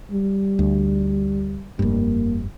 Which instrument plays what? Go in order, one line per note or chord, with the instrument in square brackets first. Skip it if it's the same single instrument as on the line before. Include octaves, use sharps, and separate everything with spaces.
[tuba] G3
[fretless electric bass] D2
[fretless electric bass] F1 G2 [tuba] A#3